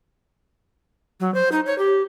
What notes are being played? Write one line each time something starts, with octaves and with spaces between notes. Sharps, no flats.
F#3
C5
D#4
C#5
G4